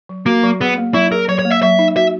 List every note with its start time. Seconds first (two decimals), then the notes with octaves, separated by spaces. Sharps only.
0.09 F#3
0.26 A#3 F#4
0.44 F#3
0.61 B3 G#4
0.78 A#3
0.94 F#3 E4
1.12 G#4 A#4
1.29 F#3 C#5
1.39 C#5
1.45 A#3
1.51 E5
1.63 F#3 E5
1.79 D#4
1.96 F#4 E5